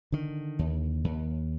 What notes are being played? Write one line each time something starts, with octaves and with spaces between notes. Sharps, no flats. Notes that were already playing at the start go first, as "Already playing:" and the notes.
D3 D#3
D#2
D#2